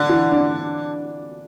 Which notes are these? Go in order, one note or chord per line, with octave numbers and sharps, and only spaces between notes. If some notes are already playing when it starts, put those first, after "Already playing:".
Already playing: D3 D4
E3
D4